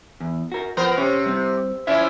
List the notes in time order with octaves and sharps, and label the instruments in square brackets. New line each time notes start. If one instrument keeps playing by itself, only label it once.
[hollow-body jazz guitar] E2
F#4 A#4
[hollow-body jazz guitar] F3 [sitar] B3 A#4 C5
[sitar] C3 [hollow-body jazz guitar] C#4 C#5
[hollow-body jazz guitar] G3 C4
[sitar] F3 C#4 E4 [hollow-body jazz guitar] E5